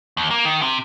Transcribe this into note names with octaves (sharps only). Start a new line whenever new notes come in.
D#2
A#3
D#3
C3